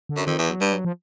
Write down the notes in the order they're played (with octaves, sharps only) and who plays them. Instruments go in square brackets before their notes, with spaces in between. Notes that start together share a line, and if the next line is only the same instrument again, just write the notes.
[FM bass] D3
[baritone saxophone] F#2
[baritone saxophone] F2 [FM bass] D#3
[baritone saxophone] E2 [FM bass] E3
[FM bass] F#3
[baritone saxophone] G2 [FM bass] G3
[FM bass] F#3
F3